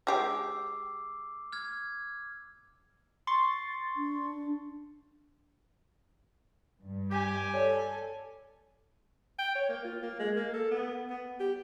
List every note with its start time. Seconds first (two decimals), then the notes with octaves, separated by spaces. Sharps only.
0.07 G#3 G4 G5 D6 E6 C7
1.52 F6 G#6
3.27 C6 C#6 A6
3.97 D4
6.82 G2
7.11 G4 G#5
7.54 A4 C#5 D5
9.39 G5
9.55 C#5
9.69 A#3
9.84 F4
10.03 A#3
10.19 G#3
10.36 A#3
10.54 A4
10.71 B3
11.10 B3
11.40 G4